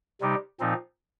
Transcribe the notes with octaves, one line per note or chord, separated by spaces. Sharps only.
C3 G3 D#4 G4
A#2 F3 C4 D#4